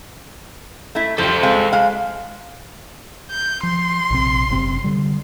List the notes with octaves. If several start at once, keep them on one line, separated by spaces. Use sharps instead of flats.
A3 E4
F3 G3 A4 C5
G#3 C4 F5
G#3 F5
G6
F3 C6
A#1 C3 C4
F#1 C3 C4
D3 G3